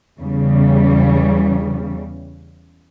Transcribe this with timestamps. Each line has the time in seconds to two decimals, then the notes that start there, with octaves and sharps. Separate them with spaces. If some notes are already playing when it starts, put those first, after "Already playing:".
0.19 E2 C#3 G3